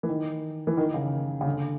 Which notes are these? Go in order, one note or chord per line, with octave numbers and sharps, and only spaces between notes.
E3
D#3
E3
D#3
C#3
C#3
D3